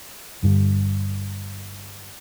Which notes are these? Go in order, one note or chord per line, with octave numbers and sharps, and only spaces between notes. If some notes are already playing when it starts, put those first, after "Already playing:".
G1 G2 D3